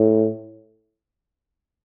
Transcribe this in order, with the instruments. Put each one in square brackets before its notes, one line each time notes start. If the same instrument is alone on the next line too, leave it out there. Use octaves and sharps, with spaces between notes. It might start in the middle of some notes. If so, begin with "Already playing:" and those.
Already playing: [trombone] A2